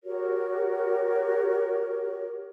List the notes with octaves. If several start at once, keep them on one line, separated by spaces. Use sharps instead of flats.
F#4 G4 A#4 C#5